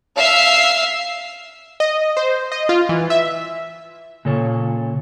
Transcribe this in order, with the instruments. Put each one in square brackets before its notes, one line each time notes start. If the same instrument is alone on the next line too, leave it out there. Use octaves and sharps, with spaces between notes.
[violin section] E5 F5 E6 C7
[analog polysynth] D#5
C5
D#5
F4
E3
E5
[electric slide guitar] A#2 C#3 A4 C#5